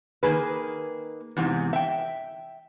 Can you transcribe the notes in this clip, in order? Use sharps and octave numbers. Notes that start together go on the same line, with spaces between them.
D#3 A#3 G#4 B4
E2 G#2 C3
E5 G5